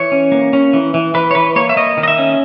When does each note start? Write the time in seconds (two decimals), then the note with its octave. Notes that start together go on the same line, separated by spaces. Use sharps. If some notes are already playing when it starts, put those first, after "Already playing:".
Already playing: E3 C#5
0.12 C#4
0.32 A#3
0.53 C#4
0.73 E3
0.94 E3
1.14 E3 B4
1.31 C#5
1.35 E3 B4
1.56 A#3 C#5
1.69 E5
1.76 A#3 D#5
1.97 D#3
2.03 D#5
2.08 E5
2.18 C#4